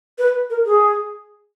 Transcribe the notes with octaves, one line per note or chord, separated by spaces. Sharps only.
B4
A#4
G#4